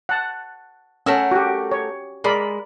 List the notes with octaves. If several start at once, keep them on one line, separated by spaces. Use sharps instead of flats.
F#5 A5
A3 C#4 A#4 F#5 E6
F#4 G4
C#5
G#3 A#4 D5 B5